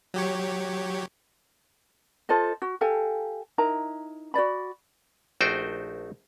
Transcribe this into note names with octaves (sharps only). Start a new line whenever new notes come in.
F#3 G4 C#5
F4 A4 C5 D#5
F#4
G4 A4 F5 G#5
D#4 E4 A#4 A#5
F#4 C5 D5 B5
A#1 A3 D#4 F#4 C5 G5